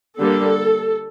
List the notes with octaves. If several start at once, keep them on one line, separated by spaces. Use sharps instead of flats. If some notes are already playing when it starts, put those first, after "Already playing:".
D3 G3 A#3 A4